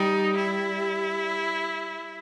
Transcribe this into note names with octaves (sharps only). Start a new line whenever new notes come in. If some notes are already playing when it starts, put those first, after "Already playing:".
Already playing: G3 D#4
E4